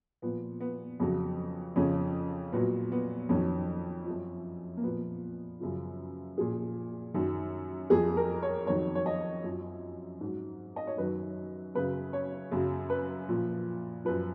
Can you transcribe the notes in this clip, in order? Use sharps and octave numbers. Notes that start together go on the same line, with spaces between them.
A#2 F3 B3
B3
F2 C#3 F#3
F2 C#3 F3 C#4
A#2 F#3 B3
B3
F2 D#3 F#3 C#4
F#2 F3
A#3
A#2 F3 B3
F#2 C#3 F3
A#2 F3 G#4
F#2 D#3 F#3
F2 F3 G#4
A#4
C#5
F2 D#3 F#3 C#5
C#5
D#5
F#2 F3
G#2 F#3
D#5
C#5
F#2 D#3 F#3 B4
F#2 C#3 F#3 B4
C#5
F#2 C#3 F#3
B4
A#2 F3
F#2 F3 B4